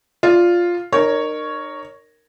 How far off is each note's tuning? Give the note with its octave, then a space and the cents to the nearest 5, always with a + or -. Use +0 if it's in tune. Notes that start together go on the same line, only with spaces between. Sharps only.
F4 +0 D5 +0
D#4 -40 A#4 -5 C#5 +0